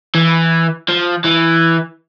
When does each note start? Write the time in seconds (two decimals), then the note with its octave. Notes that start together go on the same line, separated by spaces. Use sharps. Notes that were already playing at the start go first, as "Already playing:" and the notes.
0.15 E3
0.89 F3
1.25 E3